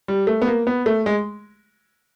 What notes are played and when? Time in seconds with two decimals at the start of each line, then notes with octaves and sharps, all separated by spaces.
0.08 G3
0.27 A3
0.42 B3
0.47 A#3
0.67 B3
0.86 A3
1.06 G#3